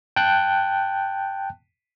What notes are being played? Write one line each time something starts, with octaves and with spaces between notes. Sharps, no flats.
G5 A5 F#6